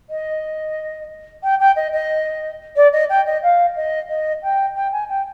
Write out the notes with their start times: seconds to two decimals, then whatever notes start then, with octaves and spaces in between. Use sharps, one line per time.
0.10 D#5
1.43 G5
1.60 G5
1.76 D#5
1.92 D#5
2.76 D5
2.92 D#5
3.09 G5
3.26 D#5
3.43 F5
3.76 D#5
4.09 D#5
4.43 G5
4.76 G5
4.92 G#5
5.09 G5